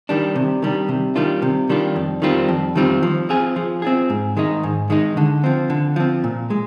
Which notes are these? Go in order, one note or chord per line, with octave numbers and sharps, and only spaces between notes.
D#3 G3 D4
C3
D#3 G3 D4
C3
D#3 G3 D4 F4
C3
D#3 G3 D4 F4
F2
D#3 G3 C4 F4
F2
D#3 G3 C4 F4
F3
C4 F4 G#4
F3
C4 F4 G#4
G#2
D#3 G#3 D#4
G#2
D#3 G#3 D#4
D3
F3 C4
D3
F3 C4
A#2
G#3